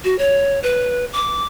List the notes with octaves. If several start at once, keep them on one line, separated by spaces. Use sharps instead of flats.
F#4
C#5
B4
D6